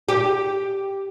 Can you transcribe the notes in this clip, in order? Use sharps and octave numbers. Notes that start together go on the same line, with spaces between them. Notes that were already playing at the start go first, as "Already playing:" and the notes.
G4